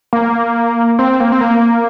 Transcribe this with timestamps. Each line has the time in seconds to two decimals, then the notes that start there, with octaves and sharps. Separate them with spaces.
0.13 A#3
0.99 C4
1.20 A#3
1.32 C4
1.41 A#3